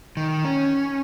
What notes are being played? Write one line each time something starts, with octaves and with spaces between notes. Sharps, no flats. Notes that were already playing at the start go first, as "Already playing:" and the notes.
D#3
C#4